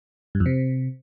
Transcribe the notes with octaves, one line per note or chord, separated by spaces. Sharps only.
G2
F2
C3